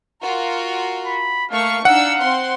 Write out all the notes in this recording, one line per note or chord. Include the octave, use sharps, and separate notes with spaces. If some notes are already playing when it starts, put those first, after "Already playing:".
F4 F#4 A#4
B5
A3 A#3 F5 C#6
D4 D#4 F5 F#5 E6
C4 C6